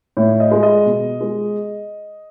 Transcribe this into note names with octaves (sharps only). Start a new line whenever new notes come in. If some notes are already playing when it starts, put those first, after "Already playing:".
A2 C#5
D#5
G#3
D#5
B2
G#3